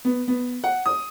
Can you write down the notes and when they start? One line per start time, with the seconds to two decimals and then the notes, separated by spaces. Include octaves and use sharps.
0.05 B3
0.28 B3
0.64 F#5
0.86 D#6